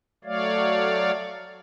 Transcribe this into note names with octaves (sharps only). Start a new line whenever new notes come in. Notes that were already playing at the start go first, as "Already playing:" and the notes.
F#3 A3 C#5 D5 F5